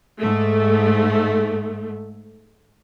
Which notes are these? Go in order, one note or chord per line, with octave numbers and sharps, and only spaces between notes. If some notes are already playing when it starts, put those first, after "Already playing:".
G#2 A3